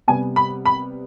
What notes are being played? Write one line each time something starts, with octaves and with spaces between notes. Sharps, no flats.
C3 G3 B3 G#5
B5
B5